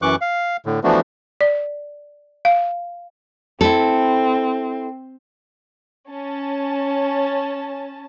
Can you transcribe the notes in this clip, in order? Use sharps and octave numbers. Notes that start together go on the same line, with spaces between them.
F#2 E3 C#6 D6 F#6
F5
A2 D3
E3 F3 A3 B3 D4 F#4
D5
F5
C4 E4 A4
C#4 A5